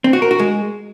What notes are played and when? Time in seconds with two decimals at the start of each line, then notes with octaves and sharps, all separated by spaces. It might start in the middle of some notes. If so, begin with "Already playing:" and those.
0.04 C4
0.13 F#4
0.22 A#4
0.31 F#4
0.40 G#3